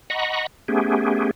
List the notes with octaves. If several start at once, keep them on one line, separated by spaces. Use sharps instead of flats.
D#5 F#5 A#5 B5 C#6
A3 B3 C#4 G4 G#4